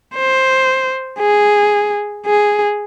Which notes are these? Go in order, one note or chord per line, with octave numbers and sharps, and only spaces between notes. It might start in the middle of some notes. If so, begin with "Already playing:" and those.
C5
G#4
G#4